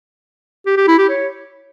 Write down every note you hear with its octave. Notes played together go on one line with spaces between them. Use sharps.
G4
G4
E4
G4
C#5